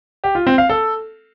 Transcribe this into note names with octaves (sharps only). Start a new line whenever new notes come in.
G4
F4
C4
F5
A4